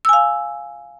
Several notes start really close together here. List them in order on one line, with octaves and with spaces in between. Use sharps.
E6 G#5 F5